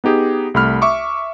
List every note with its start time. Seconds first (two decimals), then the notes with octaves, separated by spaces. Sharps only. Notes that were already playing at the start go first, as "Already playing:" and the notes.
0.04 B3 D#4 G4 G#4
0.54 C2 A3 B5 F6
0.82 E5 C#6 D6